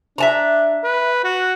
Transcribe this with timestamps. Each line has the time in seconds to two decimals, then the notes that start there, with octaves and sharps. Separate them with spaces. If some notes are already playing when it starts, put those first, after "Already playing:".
0.18 D4 E5 A5 A#5
0.84 B4
1.24 F#4